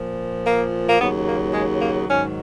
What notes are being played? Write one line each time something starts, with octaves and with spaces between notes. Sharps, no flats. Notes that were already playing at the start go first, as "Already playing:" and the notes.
Already playing: A#2 F3
A#3
A#3
D#2 C#3 F#3 B3
A#3
G#3
A#3
G#2 D#3 F#3 C#4